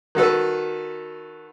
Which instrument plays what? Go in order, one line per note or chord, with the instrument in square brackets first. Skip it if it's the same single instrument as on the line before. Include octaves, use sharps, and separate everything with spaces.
[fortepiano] D#3 F#4 A4 B4